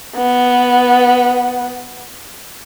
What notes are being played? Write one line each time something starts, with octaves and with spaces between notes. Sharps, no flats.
B3